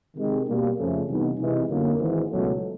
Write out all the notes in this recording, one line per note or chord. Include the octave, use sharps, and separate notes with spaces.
C3 D#3 G#3
B2 G3 A#3
F2 C#3 F3 A3
C3 E3 G3 B3 D#4
C3 E3 G#3
G1 F#2 D3 F#3 A#3
G#1 G#2 E3
C#2 B2 F#3 A3